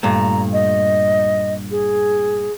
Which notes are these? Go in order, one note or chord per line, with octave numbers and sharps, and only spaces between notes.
G2 A#2 A3 A#5
D#5
G#4